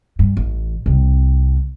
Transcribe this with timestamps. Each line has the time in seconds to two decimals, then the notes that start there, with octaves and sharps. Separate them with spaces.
0.19 G2
0.37 A1
0.86 C2 C4